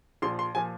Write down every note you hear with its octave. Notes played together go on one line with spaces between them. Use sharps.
A#1 A#2 F3 C6
C6
A#2 F3 G#5